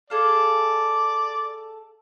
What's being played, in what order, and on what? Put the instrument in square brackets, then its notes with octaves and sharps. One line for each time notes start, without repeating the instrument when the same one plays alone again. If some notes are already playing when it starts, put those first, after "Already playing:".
[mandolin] G#4 A4 F5 [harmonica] D5